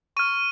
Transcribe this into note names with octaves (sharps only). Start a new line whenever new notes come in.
C#6 F6 D#7